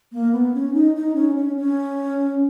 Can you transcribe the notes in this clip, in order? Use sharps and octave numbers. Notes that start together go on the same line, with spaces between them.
A#3
B3
C#4
D#4
D#4
C#4
C#4
C#4